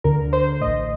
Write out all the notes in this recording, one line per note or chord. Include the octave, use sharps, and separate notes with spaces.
D2 D3 A#4
C5
A1 A2 D#5